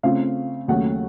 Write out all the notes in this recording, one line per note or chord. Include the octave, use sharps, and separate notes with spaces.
C#3 A3 C4 F4 F5
D#2 C#3 F#3 A3 F#5